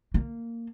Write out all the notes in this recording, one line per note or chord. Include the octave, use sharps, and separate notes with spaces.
A#3